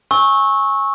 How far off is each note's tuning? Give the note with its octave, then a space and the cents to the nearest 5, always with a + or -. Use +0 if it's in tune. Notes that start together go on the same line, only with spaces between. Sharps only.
G#5 +0 C#6 -15 E6 -25